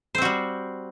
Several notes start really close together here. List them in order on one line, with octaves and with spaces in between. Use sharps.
C5 C4 F#4 G3